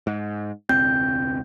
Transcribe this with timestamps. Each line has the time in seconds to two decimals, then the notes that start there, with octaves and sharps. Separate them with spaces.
0.07 G#2
0.69 E1 C#2 C4 G6